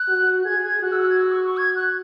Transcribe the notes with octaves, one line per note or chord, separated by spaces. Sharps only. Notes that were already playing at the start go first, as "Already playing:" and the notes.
Already playing: F#6
F#4
G#4 G#6
G#6
F#4 F#6
E6
F#6
G#6
E6
C#6
C#6
G#6
F#6